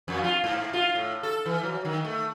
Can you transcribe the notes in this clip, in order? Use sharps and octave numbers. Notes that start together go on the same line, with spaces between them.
F2
F4
G#2
F4
A2
A4
E3
F#3
D#3
A3